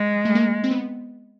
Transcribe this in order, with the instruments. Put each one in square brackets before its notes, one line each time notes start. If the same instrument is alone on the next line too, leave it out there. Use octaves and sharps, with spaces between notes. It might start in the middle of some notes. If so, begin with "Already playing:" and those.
Already playing: [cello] G#3
[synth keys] A3
A#3
C4
B3